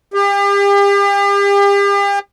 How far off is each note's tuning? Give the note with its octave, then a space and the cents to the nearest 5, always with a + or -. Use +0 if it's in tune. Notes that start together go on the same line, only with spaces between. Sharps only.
G4 +40